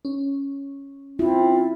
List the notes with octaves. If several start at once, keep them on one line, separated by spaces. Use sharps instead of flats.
C#4
C4 E4 F4